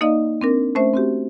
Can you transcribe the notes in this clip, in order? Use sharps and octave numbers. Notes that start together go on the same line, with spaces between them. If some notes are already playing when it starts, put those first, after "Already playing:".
A#3 D#4 D5 D#5 F5
C4 D4 A#4
A3 C#4 C5 E5
C4 F#4 G4